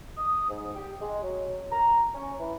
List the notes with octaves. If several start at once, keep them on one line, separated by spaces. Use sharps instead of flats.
D#6
G#2
G4
G#3
F#3
A#5
C#4
E3